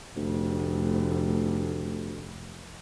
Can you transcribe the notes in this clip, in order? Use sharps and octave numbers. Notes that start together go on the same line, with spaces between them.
F1 D2